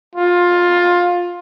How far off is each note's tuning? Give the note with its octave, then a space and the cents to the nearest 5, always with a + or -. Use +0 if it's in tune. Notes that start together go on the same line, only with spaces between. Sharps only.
F4 +15